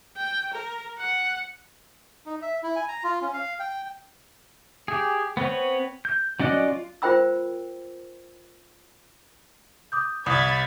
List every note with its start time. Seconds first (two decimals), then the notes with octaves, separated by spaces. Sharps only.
0.17 G5
0.53 A#4
0.98 F#5
2.26 D#4
2.42 E5
2.63 E4
2.76 G#5
2.88 A#5
3.04 F4
3.21 C#4
3.33 F5
3.60 G5
4.88 G4 G#4
5.37 B3 C4 B4 C#5
6.05 G6
6.40 F#3 C#4 D5 D#5 F#6
6.68 F4
7.02 F4 A#4 C5 G5 B5 E6
9.92 D6 D#6 G6
10.26 C2 B5 D#6 G#6 A6